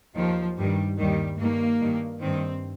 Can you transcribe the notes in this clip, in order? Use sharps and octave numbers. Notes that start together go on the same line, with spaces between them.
D#2 D#3 F3
G2 D#3 G3
D#2 D#3 G3
G2 D#3 A#3
G2 D#3
G2 D#3 C4